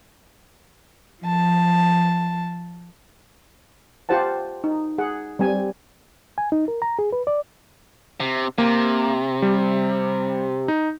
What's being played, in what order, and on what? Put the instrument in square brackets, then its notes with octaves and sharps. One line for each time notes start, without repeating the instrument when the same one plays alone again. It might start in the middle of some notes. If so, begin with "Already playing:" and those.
[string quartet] F3 A5
[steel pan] F4 G4 C5 F#5 A5
D#4
G#4 F#5
G3 C4 G#5
[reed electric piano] G#5
D#4
A#4
A#5
G#4
B4
D5
[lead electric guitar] C3
[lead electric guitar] C3 [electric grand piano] A#3
[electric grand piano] G3
D#4